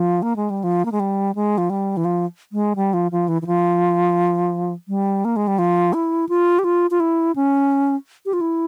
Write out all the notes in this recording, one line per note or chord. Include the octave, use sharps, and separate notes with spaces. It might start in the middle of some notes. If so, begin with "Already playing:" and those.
Already playing: F3
A#3
G#3
G3
F3
A#3
G#3
G3
G#3
F3
G3
E3
F3
G#3
G3
F3
F3
E3
E3
F3
G3
A#3
G#3
G3
F3
E4
F4
G4
F4
F4
E4
C#4
G4
F4
E4